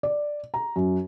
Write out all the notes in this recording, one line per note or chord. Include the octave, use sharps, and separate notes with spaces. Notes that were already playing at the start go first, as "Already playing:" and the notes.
D5
A#5
F#2